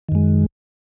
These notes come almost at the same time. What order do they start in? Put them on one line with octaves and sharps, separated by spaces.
D#3 F#2 G#3